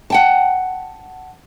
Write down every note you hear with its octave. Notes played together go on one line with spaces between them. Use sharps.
F#5 G5 A5